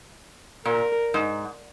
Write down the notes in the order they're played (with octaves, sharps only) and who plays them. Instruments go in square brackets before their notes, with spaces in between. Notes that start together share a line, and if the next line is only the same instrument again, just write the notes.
[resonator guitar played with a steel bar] A#2 [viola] A#4
[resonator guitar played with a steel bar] G#2